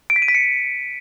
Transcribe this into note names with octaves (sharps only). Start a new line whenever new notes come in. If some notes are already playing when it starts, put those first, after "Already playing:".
D7
B6
D#7
B6
C#7